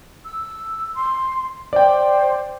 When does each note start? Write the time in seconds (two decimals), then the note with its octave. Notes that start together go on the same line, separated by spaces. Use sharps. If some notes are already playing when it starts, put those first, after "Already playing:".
0.25 E6
0.95 C6
1.73 C5 D5 G5